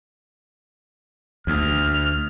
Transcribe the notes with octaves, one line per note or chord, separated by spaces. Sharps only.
D2 F6